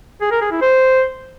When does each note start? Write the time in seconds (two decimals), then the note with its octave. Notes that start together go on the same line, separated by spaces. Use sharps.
0.21 G#4
0.31 A#4
0.41 G#4
0.51 E4
0.61 C5